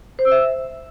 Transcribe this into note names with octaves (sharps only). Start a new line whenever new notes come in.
C5
E6
E5